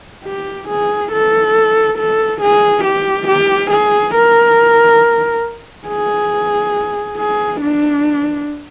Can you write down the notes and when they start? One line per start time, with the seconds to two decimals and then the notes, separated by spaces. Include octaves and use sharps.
0.25 G4
0.69 G#4
1.12 A4
1.99 A4
2.41 G#4
2.84 G4
3.28 G4
3.71 G#4
4.15 A#4
5.88 G#4
7.17 G#4
7.61 D4